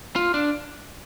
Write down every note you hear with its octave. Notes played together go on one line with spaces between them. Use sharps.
F4
D4